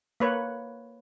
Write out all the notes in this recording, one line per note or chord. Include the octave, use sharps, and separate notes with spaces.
A#3 B4 C#5